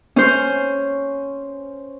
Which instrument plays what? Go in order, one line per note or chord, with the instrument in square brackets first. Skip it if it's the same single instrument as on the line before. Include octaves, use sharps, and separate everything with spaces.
[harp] C#4 C5